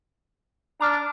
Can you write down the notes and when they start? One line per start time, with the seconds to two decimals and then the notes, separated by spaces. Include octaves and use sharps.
0.81 D4 A#5 D6 F6